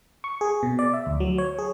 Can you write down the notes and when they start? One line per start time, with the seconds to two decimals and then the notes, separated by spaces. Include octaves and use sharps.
0.24 C#6
0.41 G#4
0.63 B2
0.79 D5
0.93 E5
1.06 D2
1.20 F#3
1.38 C#5
1.58 G#4